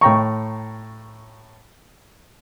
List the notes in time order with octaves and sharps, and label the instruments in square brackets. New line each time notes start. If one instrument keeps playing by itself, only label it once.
[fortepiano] A2 G5 A#5 C#6